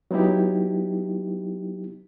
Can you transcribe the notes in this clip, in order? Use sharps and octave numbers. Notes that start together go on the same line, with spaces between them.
F#3 B3 D#4 E4 G4